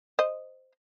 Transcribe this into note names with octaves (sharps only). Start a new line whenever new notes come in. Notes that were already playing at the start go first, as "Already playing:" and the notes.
C5 D#5